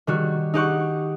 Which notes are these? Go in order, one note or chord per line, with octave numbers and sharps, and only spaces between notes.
D#3 G3 F#4
D#4 G4 F#5 C#6